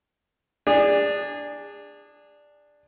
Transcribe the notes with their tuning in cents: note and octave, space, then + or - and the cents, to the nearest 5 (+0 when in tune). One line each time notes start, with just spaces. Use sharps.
D4 +0 G#4 -25